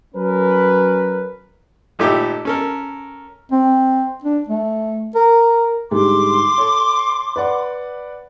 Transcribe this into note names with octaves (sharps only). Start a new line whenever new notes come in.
F#3 C#4 A#4 B4
G#1 A#2 A3 D#4 G4 E5
C#4 A4 A#4
C4
D4
A3
A#4
G#2 D3 G3 C6 D6
A4 C#5
B4 D5 F#5